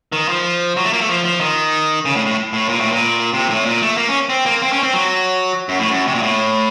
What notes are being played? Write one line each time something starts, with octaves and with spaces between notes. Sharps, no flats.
D#3
F3
F#3
A3
A#3
A3
F3
F3
D#3
C#3
A2
A2
A2
A#2
A2
A#2
C3
A2
A#2
A3
A#3
C#4
C4
A#3
C4
C#4
C4
F#3
F#2
A2
F#2
C3
A#2
A2